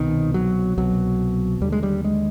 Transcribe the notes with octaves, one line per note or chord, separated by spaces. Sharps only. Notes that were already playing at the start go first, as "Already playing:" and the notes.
Already playing: C2 B2 D#3
F#3
C2 B2 F#3
D#2 D3 G3
G#3
G3
G#3